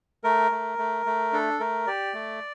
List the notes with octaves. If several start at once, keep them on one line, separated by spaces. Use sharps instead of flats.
A3 A#4
A3
A3
A3
D4 A4
A3 A#4
G4 D5
A3